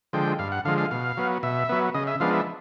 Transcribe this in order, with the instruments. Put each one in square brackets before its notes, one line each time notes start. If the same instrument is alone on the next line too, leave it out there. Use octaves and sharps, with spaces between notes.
[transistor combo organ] D3 F3 G#3 G5
G2 F5
F#5
D3 F3 G#3 F5
F5
B2 F5
F#3 B3
B2 E5
F#3 B3
C#3 D#5
E5
F3 G#3 B3 D4 F5
E5